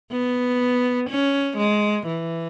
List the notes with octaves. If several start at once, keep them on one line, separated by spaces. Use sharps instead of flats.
B3
C#4
G#3
E3